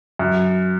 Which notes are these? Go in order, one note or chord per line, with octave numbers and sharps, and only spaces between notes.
F#2